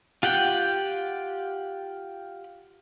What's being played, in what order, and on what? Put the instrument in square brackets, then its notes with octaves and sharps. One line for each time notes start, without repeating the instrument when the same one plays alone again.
[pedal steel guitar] F4 G4 F#5 G5